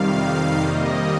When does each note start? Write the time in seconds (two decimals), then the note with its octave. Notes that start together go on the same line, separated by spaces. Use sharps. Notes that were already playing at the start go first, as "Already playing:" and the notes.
Already playing: F2 C3 D#3 G3 F5
0.61 C3 D#3 G3 A#3 D#5